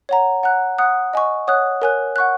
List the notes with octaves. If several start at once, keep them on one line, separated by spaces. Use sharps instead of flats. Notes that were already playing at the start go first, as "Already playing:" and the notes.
C#5 F#5 A#5
F#5 A#5 F#6
F#5 D#6 F#6
D#5 G#5 C#6
C#5 F#5 D#6 F#6
A#4 C#5 G#5 F#6
F#5 C#6 F#6